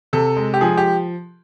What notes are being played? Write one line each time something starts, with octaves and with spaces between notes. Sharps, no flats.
C3 A4
G#3
G4
F3 G#4
G4